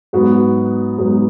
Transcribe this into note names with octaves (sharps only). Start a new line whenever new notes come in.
G#2 F#3 B3 F#4
G#2 F#3 B3